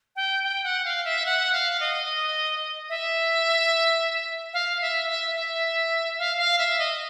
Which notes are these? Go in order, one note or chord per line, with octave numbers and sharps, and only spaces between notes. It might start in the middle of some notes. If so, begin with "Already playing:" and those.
G5
G5
F#5
F5
E5
F#5
F5
D#5
E5
F5
E5
E5
E5
F5
F5
E5
D#5